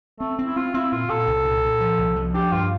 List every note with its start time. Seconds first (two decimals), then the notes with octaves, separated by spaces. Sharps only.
0.20 A3 C4
0.39 C4
0.46 E4
0.56 C4 F4
0.74 C4 E4
0.92 A#2 F4
1.09 A#2 A4
1.27 C2
1.45 A#2
1.63 A#2
1.81 F3
1.99 C2
2.16 F3
2.34 D4 G4
2.52 G2 F4